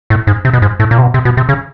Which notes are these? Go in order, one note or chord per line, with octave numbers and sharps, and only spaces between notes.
A2
G#2
C3
B2
G#2
A2
A#2
C3
B2
C3
B2
C3
C#3